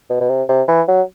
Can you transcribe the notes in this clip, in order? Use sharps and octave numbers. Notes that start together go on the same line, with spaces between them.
B2
B2
C3
C3
E3
F#3